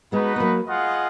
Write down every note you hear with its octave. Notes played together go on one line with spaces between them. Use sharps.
G#3 B3 D#4 F#4 B4
B3
F#3 A#3
F4 G#4 D#5 F#5